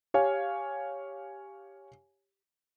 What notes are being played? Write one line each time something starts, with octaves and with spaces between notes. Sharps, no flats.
G4 C#5 F5 G#5